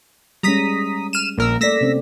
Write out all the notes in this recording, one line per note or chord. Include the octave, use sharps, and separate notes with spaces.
G3 G#3 C#4 A#5 D#6 B6
F6 D#7 E7
A#1 A#3 A#4 E6
A3 D5 E6 A#6 B6
C3 C4 C#4